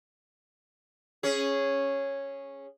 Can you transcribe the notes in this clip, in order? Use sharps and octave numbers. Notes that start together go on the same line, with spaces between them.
C#4 G#4